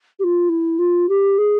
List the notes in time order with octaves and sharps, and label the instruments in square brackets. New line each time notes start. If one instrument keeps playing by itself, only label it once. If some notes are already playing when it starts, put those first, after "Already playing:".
[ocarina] G4
F4
E4
F4
G4
G#4